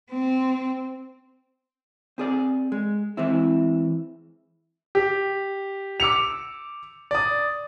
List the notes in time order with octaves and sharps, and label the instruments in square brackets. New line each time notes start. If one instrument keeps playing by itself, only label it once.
[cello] C4
[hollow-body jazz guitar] C4 G#4 D5
G#3
E3 G#3 C4 E4
[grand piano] G4
D6 E6 C#7 F7
D5 D#6